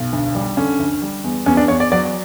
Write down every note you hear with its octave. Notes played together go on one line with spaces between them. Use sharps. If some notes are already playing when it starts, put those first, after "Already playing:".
Already playing: B1
D2
G3
D3 C#4
D2
G3
E2
E2 C#4
D4
E2 C#5
D5
F#3 D5